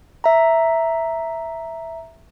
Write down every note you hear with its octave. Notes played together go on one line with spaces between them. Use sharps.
E5 A#5